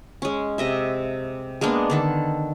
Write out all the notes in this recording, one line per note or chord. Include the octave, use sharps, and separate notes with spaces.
G#3 C#4
C3 D#5 E5
G#3 A#3 B3 D4
D3 D#3 A4